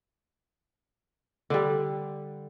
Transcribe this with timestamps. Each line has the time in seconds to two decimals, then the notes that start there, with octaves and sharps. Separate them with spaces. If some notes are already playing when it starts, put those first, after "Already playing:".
1.50 D3 G3